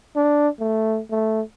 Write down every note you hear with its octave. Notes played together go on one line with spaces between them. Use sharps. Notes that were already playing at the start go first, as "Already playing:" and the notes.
D4
A3
A3